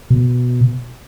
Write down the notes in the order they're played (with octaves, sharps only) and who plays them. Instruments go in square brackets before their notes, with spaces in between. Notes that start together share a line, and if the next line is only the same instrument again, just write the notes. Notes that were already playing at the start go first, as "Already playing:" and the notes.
[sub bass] B2